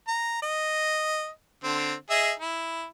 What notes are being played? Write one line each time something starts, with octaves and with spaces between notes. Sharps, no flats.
A#5
D#5
D3 C4
G#4 D#5 E5
E4